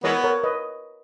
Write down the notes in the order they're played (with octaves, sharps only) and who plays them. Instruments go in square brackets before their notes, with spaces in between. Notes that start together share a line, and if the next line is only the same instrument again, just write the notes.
[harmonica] E3 G#3 B3 [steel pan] A#4 C#5
[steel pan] A#4 C#5
B4 D#5